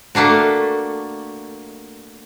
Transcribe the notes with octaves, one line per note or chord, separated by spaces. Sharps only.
A3 A#3 D4 F#4